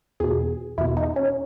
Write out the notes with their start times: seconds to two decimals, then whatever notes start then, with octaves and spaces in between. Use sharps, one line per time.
0.20 E2 B2 G#4
0.78 E2 B2 E4
0.97 D#4
1.16 C#4